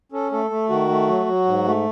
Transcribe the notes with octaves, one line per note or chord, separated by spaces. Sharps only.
C#4 A4
A3 A4
A3
D#3 F#4
A3
F#3
F#3
G#2
A3